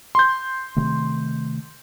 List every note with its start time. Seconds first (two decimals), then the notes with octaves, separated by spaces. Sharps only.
0.15 C6 G6
0.77 C3 D#3 A3